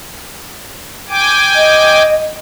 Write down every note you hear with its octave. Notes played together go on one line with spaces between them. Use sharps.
G5 G#5 D6
D#5